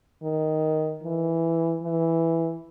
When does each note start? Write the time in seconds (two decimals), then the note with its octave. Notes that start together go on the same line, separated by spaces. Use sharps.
0.22 D#3
1.03 E3
1.83 E3